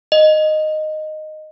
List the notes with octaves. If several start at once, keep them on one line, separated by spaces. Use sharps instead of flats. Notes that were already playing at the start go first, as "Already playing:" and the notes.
D#5